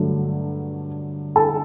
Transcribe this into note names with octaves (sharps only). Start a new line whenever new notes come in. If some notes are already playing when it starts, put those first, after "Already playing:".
Already playing: G2 D3 F#3 A3 D4
A4 A5